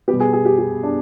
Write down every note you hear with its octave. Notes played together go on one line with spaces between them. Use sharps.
B2 G3 B3 G4
G#4
G#4
G4
G4
D4